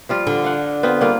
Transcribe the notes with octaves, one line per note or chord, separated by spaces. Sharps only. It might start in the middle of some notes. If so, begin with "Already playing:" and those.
F3 G3 F4
D3
F5 F#5
B3 C4 F4
G3 A#3 F4